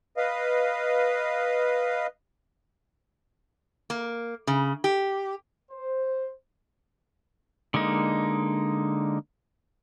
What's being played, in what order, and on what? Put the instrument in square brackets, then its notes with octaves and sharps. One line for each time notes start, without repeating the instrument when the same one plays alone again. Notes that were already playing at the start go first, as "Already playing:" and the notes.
[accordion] B4 D#5 F5
[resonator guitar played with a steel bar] A#3
C#3
G4
[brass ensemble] C5
[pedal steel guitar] D3 G#3 A#3 D#4